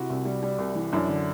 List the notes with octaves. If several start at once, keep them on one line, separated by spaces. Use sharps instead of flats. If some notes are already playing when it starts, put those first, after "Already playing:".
Already playing: C3 E4 F#4
C2
G3
G3
C2
E3
F#2 D4 E4
D3